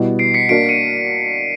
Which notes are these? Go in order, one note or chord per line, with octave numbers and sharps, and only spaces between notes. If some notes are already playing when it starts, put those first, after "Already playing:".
Already playing: B2 G3 B3 E4
C7 D7
B6 C#7
A#3 D4 F#4 A#4 D5 C7 D7
C#7 D#7